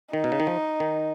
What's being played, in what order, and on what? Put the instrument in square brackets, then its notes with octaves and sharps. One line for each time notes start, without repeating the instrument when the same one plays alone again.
[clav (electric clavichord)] D#3 [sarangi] D#4
[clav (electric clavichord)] B2
C#3
D#3
F3
D#3